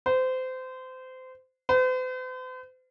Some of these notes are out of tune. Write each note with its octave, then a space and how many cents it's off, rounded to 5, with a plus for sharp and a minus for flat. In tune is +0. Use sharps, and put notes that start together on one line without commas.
C5 -25
C5 -45